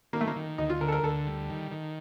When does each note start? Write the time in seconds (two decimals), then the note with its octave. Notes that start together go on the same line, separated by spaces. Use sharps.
0.13 D#3 A#3
0.21 A3
0.27 A#3
0.36 D#3
0.58 D2 D#4
0.70 F4
0.81 D3 A#4
0.88 A4
0.92 A#4
1.03 D2 A4
1.27 G3
1.49 D#3
1.72 D#3